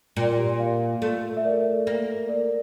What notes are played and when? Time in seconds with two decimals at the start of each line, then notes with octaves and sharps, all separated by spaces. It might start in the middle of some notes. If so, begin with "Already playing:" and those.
0.17 A#2 F4
0.38 G4
0.59 D5 F5
1.02 A3
1.37 E5
1.45 A#4 D5
1.87 A#3
2.28 A#4 D5